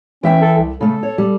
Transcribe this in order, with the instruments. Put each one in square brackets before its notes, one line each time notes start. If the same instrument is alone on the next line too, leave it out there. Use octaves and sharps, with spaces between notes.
[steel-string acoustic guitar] E3 E5 G5 [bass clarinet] C#4
[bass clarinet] A4
C2
[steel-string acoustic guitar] C#3 A3 [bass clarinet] A4
[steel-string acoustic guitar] C#5
G3